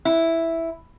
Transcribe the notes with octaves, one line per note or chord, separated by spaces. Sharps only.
E4